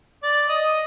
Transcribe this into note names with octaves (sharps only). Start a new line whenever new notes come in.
D5
D#5